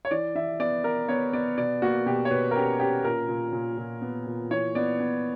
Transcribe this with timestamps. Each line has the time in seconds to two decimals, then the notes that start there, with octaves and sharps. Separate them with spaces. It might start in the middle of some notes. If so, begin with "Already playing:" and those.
0.05 C#5
0.11 E3 D5
0.35 E3 E5
0.60 B3 D5
0.84 B3 A#4
1.08 B3 C#5
1.33 B3 D5
1.58 B2 D5
1.82 A#3 F#4
2.06 B2 G4
2.25 C#5
2.31 B2 B4
2.51 A#4
2.56 C#4 G4
2.80 C#4 G4
3.04 A#2 A#4
3.29 A#2
3.53 A#2
3.78 A#2
4.02 B3
4.27 A#2
4.51 E3 C#5
4.75 B3 D5
4.99 B3